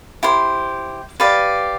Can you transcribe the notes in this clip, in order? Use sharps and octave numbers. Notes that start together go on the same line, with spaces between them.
E4 G4 C5
G4 B4 D5 F5